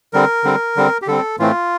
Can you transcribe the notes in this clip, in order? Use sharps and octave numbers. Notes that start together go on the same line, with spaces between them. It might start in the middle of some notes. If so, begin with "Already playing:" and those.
D3 G3 C4 A#4
D3 G3 C4
D3 G3 C4
G4
D3 G3 C4 A4
A2 E3 A3 C4 F4